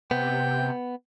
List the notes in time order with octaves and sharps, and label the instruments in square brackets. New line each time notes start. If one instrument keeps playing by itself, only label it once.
[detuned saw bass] C3 [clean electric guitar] B3 [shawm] G5